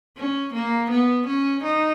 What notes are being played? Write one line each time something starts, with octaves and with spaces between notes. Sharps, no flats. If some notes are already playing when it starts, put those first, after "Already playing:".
C#4
A#3
B3
C#4
D#4